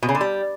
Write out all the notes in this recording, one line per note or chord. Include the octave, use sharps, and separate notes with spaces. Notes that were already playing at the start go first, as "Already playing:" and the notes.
B2
C#3
D3
G3